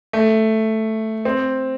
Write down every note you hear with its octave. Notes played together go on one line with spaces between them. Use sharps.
A3
C4